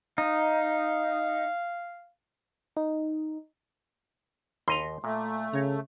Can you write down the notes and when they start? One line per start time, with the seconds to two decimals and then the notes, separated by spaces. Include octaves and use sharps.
0.18 D#4 F5
2.77 D#4
4.68 D#2 D#5 A#5 C6
5.04 A#2 A3
5.54 C#3 C#5 A#5